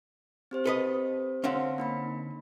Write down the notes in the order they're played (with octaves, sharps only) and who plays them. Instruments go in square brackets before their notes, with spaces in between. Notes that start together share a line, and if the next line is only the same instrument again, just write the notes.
[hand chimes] C4 G4 C5
[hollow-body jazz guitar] A4 B4 D#5
[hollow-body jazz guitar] D3 C4 C#4 [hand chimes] F5 F#5
[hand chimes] A#3 D#4 B5